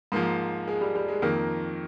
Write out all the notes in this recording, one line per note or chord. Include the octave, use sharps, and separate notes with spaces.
G#2 F3 A#3
G#3
G3
G3
G#3
F2 D#3 A#3